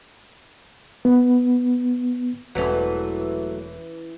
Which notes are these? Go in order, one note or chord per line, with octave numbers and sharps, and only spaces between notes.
B3
E1 E3 F#3 A3 C#4